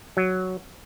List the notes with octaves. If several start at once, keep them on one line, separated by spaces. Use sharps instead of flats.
F#3